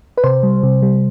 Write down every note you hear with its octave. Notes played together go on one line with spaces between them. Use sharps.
B4
C3 C5
G3
C3
G3